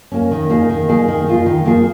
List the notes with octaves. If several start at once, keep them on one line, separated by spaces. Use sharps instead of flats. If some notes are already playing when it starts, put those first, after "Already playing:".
A#3 C#4
D#3
A#3 D#4 G#4
D#3
A#3 D#4 G#4
D#3
A#3 F4 G#4
D#3
A#3 F4 G#4